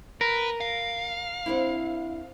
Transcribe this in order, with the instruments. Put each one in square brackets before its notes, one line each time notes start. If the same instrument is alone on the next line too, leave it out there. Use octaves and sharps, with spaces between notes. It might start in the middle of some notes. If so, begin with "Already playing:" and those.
[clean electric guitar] A#4 [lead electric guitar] B4
[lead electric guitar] F5
[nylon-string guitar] C4 D4 E4